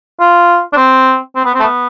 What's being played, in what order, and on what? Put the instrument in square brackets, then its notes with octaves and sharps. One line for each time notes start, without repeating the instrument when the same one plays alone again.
[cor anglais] F4
D4
C4
C4
B3
C4
A3
B3